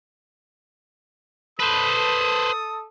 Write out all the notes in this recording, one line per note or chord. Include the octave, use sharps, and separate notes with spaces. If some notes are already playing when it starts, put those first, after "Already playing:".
A4 B4 C5 A5 D#6